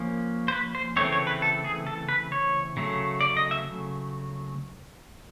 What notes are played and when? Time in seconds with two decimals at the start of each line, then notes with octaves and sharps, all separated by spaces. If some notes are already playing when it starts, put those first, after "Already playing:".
Already playing: F3 A#3 C#4
0.48 C5
0.52 B4
0.75 C5
0.96 C#3 E3 A3 C4 C#5
1.12 C#5
1.27 B4
1.42 A4
1.64 G#4
1.87 A4
2.09 B4
2.32 C#5
2.77 C#3 F#3 A3
3.21 D5
3.37 D#5
3.51 E5